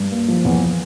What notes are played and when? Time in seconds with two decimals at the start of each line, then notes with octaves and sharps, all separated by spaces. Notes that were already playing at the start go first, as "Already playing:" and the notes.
Already playing: G2
0.11 A#3
0.28 F3
0.45 E2